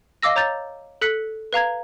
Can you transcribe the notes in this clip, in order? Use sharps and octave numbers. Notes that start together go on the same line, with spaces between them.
D#5 F5 D6 E6 A#6
C#5 A#5 G6 A6
A4 F#6 B6 C#7
B4 F5 A#5 G#6